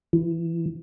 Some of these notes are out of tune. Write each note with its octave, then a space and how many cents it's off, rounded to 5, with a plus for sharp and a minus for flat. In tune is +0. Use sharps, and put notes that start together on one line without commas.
E3 +20